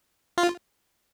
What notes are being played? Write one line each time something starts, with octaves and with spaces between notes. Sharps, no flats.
F4